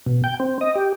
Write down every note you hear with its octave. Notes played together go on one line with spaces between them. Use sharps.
B2
G5
C4
D#5
G4